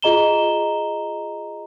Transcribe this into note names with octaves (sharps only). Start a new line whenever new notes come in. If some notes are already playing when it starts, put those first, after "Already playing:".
F4 G#4 D#5 A#5 E7 G7